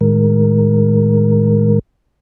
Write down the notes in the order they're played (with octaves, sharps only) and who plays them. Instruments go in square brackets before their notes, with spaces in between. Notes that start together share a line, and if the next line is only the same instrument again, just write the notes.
[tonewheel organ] A2 D#3 G#3 A#4